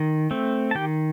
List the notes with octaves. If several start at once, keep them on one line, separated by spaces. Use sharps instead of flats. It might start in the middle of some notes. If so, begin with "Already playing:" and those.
Already playing: D#3
A3 C4
A5
D#3 G4 G5